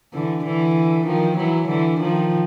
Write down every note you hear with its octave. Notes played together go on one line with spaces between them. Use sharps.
D3 E3
D3 E3
D#3 F3
E3 F#3
D3 E3
D#3 F3